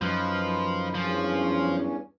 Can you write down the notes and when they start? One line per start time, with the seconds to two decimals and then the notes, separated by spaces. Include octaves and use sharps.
0.01 F#2 F3 D#4 B4
0.94 E2 G2 F3 C#4